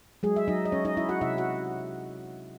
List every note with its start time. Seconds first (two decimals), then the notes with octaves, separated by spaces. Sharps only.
0.23 F#3 G#3 G#4
0.36 E5
0.48 F#3 D#4 D#5
0.65 D#5
0.72 C#4 C#5
0.85 D#4 D#5
0.97 C#4 E4 E5
1.09 F#4 F#5
1.21 C3 E4 E5
1.38 F#4 F#5